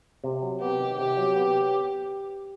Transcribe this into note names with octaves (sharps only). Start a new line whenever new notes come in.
C3
F#3
B3 G4
D#3
C3 G4
F#3
B3